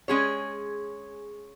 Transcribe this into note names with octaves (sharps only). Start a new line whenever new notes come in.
G#3 C#4 G#4 C#5